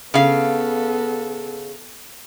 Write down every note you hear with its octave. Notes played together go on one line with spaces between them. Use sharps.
C#3 B3 A4 F5